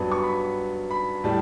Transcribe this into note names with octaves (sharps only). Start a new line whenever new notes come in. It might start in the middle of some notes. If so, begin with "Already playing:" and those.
Already playing: G2 F#3 B3
C#6
B5
B5
A2 G3 A5